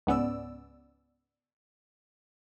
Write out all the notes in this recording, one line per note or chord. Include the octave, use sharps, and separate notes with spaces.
C#2 G#2 B3 C#4 D5 E6